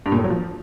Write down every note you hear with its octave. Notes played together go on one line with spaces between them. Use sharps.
G2
A#2
A2
F#3
F3